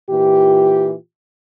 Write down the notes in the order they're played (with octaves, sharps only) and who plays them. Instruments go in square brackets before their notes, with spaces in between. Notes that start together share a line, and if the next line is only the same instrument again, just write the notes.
[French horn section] A#2 E3 F4 G4